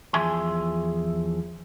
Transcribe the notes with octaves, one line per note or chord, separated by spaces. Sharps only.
E2 F3 G#4 E5 G#5 C6